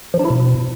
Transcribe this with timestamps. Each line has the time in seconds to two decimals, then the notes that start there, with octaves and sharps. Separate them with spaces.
0.14 F3
0.19 D4
0.25 E4
0.30 B2